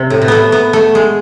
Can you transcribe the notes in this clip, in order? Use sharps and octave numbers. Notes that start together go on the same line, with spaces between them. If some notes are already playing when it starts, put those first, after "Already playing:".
Already playing: C3
A2
B2
A3 B3
B3
A3
G#3